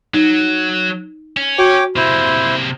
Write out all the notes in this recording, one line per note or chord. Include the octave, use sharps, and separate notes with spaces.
F#3 D#4
C#4
F#4 C#5 G5 D6
C3 A#3 E4 C5